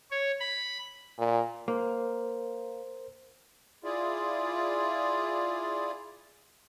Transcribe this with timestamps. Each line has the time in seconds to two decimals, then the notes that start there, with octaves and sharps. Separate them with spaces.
0.11 C#5
0.40 B5
1.18 A#2
1.68 A#3 A#4 C5
3.84 E4 F4 G#4 D5